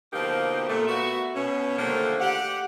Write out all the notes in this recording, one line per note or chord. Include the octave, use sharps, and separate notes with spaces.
B2 D3 F3 A#3 D#4 G4
A#2 A3
B3 F#4 E5
B2 C#4
D3 D#3 F3 G3 A3 A#3
G4 F#5